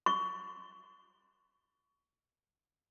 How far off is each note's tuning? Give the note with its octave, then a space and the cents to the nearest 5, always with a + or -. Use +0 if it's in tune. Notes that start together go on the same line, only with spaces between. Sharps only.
C#6 +25